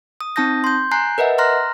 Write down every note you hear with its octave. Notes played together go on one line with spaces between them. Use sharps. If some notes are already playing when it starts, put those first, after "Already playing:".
D#6
C4 D#4 A5 D#6 G6 A#6
C6 G6
G#5 A#5 F#6 G6 C7
A#4 B4 D#5 E5 F#5
A#5 C6 F6 F#6 A#6